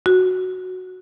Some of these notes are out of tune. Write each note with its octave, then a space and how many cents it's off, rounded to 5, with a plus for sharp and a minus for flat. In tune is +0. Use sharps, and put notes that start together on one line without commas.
F#4 -5